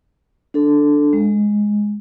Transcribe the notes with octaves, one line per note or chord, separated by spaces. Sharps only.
D4 A4
G#3